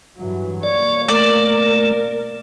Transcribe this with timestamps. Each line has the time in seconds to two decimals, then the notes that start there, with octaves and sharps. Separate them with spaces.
0.18 G2 E3 F#3
0.63 B2 A#3 C#5 D5
1.09 A3 A#4 D5